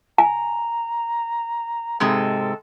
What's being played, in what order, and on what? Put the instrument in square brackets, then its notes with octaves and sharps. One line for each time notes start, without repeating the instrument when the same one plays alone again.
[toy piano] G#5 [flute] A#5
[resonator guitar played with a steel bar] G#2 C3 G#3 [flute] A4